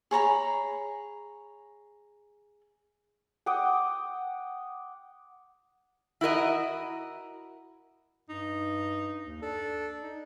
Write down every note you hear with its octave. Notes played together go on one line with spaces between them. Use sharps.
G#4 C#5 A#5 B5
F#5 G5 D6 D#6
E4 F#4 A#4 D#5
G2 D#4
D#2
D4 A4
D#4